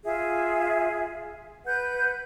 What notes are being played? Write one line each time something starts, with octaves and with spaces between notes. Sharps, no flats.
F4 G#4 E5
B4 F#5 G6